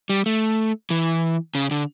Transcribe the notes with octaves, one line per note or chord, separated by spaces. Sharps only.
G3
A3
E3
C#3
D3